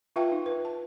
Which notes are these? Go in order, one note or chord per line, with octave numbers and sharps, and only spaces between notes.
F4 B4 E5 F5 G5 A5
D#4
B4
A5